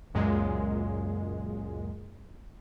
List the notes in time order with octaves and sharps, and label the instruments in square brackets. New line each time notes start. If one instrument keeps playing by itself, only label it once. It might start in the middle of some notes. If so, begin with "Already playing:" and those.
[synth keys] C#2 F#2 A#2 G#3